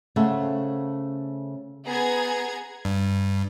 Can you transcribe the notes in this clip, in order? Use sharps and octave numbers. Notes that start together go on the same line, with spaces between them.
C#3 A3 C5 E5 F#5
B3 G#4 A#5 G#6
G2